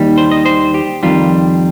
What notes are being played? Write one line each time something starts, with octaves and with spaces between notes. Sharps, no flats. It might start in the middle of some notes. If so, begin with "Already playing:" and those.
Already playing: D#2 D#3 G3
C5
D#5
C5
G4
F2 D#3 G3 F4